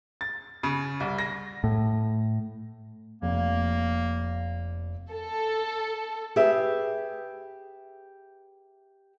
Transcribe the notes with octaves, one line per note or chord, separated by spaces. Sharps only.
A6
C#3
C2
A#6
A2
F1 A#3
A4
G4 G#4 B4 E5